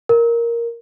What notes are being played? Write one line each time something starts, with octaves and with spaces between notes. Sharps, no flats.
A#4